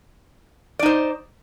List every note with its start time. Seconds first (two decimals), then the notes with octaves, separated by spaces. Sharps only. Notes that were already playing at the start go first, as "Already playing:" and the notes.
0.79 D5
0.83 D#4
0.86 C5